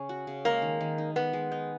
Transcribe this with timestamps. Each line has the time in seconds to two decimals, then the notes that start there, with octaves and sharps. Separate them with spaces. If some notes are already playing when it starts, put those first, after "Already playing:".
Already playing: C#3 C#4
0.09 F#4
0.27 C#3
0.45 G#3 A#3
0.62 D#3
0.81 D#3
0.98 D#4
1.16 D#3 B3
1.33 G#3
1.52 D#4